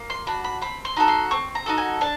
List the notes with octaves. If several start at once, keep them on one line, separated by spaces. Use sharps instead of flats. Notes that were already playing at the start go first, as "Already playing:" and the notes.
Already playing: A#3
C6
D4 F#4 B5
B5
C4 B5
C6
D#4 F#4 A4
C6
C4 C#6
A#5
D#4 F#4 A4
G#5
D4 A5